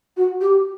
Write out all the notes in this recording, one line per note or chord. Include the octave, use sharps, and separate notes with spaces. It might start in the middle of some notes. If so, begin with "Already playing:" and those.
F#4
G4